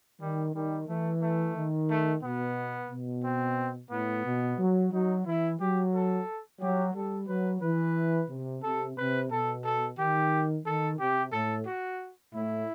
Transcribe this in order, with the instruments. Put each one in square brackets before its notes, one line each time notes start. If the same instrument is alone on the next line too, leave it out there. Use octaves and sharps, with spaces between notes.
[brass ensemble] D#3 [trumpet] G3
[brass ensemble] D#3 [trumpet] G3
[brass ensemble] E3 [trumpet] A3
[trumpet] A3
[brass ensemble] D#3
[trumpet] A3
[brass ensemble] B2 [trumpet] B3
[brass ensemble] B2
[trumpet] C4
[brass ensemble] A2 [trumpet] B3
[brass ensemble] B2
F#3
[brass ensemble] F#3 [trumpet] D#4
[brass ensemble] E3 [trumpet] E4
[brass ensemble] F#3 [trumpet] G4
[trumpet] A4
[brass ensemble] F#3 [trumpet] G4
[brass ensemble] G3 [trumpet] A4
[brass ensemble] F#3 [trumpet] B4
[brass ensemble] E3 [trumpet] B4
[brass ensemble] C3
[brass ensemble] C3 [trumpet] A4
[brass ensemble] C3 [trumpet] B4
[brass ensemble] B2 [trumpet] A4
[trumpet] A4
[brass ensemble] D#3 [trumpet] G4
[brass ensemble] D#3 [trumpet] A4
[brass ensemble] C3 [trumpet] G4
[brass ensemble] A2 [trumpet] A4
[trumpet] F#4
[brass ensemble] A2 [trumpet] E4